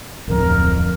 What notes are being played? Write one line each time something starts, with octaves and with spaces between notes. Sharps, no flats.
D1 F2 A#4